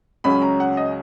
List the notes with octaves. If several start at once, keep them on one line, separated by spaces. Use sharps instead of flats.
C#2 C#3 F#3 C#4 B5
A#5
F#5
D#5